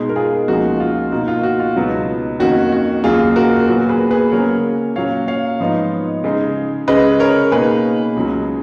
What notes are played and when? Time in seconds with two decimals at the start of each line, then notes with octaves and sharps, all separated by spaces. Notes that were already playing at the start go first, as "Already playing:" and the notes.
Already playing: B2 G#3 D#4
0.09 A#4
0.16 F4 G#4
0.48 C#2 C#3 F3 A#3 D#4 F#4
0.80 F4
1.12 B2 A#3 D#4 F#4
1.28 F4
1.43 F#4
1.60 F4
1.76 C#2 B2 F#3 B3 D#4
2.39 F2 D#3 A#3 C#4 F#4
2.72 F#4
3.04 D#2 C#3 F#3 F4 G#4
3.36 F#4 A#4
3.67 A#2 F#3 B3 F#4 A#4
3.89 G#4 B4
4.11 G#4 B4
4.32 C#3 F#3 A#3 C#4 A#4 C#5
4.96 A#2 F#3 C#4 C#5 F5
5.28 C#5 F5
5.60 G#2 F3 B3 D#4
6.24 C#3 G#3 D#4
6.88 C#3 G#3 C#4 B4 D#5
7.20 A#4 C#5
7.52 B2 A#3 D#4 G#4 B4
8.16 C#2 C#3 F#3